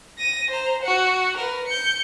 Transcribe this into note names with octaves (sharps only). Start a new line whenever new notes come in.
A#6 D#7
C5 A#5
F#4 F#5
A#4 B4
G6 C#7